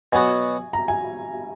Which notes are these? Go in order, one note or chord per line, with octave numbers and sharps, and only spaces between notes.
B2 F#3 B3 F#4 G#5
A#5
G#5